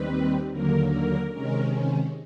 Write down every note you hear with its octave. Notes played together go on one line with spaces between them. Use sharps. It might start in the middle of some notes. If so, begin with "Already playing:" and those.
Already playing: D#2 D#3 G3 C4 B4
D#2 D3 F#3 A#3 A#4
A#4
C3 D#3 G#3 C#4 A#4